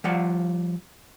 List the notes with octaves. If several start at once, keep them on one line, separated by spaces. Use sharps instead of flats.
F3 G3 F4 F#5